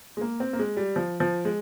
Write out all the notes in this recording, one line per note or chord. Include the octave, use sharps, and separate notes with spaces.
G#3
A#3
C4
A#3
G#3
G3
F3
F3
G#3